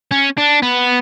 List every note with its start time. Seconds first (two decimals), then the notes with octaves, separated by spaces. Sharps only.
0.11 C#4
0.37 D4
0.62 B3